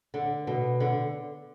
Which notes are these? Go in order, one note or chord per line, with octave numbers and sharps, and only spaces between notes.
D3
B2
D3